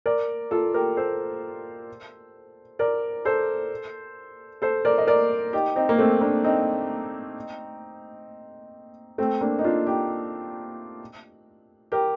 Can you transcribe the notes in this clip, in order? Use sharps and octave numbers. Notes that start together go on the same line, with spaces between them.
A#4 D5
F4 A4
G4 A#4
A4 C5
A#4 D5
A4 C5
A4 C5
A#4 D5
D#5
A#4 D5
D#4 G4
C4 D#4
A#3
A3 C4
A#3 D4
C4 D#4
A3 C4
A#3 D4
D#4
D4 F4
D#4 G4
G4 A#4